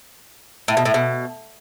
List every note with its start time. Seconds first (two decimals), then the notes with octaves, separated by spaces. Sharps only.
0.68 A2
0.77 B2
0.85 A2
0.94 B2